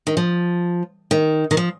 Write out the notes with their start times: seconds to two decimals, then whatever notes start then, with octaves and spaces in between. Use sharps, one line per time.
0.07 D#3
0.17 F3
1.11 D#3
1.51 D#3
1.57 F3